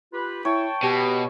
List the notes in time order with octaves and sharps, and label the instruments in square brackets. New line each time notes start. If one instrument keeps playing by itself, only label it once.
[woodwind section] F4 G4 B4
[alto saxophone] E4 [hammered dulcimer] C#5 [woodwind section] G5 A5
[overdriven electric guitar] B2 [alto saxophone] G4